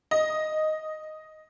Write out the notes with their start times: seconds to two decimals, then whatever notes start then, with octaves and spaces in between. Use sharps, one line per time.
0.11 D#5